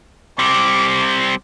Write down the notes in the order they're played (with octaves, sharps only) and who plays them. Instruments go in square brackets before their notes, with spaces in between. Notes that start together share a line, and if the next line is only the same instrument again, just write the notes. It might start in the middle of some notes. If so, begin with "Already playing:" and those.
[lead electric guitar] G3 C4 [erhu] D6